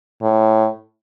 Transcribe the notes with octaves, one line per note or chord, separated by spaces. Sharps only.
A2